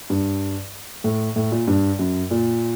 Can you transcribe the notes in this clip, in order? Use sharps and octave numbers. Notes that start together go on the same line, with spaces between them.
G2
A2
A2
A#2
G2
F#2
A#2